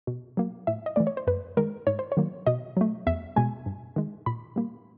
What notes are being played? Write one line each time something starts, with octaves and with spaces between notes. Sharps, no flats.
B2
F#3 A#3
A2 E5
D#5
E3 A3 D5
C#5
C5
F#2 B4
D#3 G#3 A#4
G#2 C#5
C5
C#5
D#3 F#3 A#3
B2 D#5
F#3 A3
E2 E5
B2 G#3 G#5
G2
D#3 G#3
A#2 B5
G3 A#3